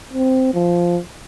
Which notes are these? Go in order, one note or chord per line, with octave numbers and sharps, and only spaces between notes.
C4
F3